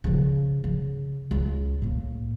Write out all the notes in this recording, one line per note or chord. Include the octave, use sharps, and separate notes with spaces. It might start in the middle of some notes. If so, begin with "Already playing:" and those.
C#3 F3
C#3
C#2
A2 A#3